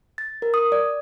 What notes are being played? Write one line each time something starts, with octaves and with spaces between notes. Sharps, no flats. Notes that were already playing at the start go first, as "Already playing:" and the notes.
A6
A#4
D#6
D5